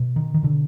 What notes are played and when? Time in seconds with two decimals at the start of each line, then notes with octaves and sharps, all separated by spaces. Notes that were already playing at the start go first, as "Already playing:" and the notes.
Already playing: B2
0.16 D#3
0.34 D#3
0.43 B2 D3